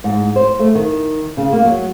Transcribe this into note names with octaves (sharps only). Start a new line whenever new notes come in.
G#2
C5
A3
D#3
C#3
A#3
F#3